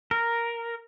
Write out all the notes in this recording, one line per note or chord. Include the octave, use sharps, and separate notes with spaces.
A#4